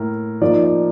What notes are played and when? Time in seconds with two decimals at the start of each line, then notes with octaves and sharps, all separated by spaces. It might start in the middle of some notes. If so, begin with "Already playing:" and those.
Already playing: A2 A#3 A#4
0.41 F3 A#3 D#4 D5
0.64 D5